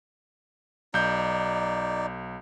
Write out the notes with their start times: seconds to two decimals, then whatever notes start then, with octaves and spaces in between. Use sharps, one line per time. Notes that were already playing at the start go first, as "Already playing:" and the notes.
0.94 B1 D#4 D5 G6